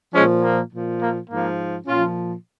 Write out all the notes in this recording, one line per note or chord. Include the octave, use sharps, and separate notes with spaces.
A#2 F3 G#3 C#4
A#3
A#2 F3
A#3
G#2 F3 A#3
A#2 F3 C#4 F4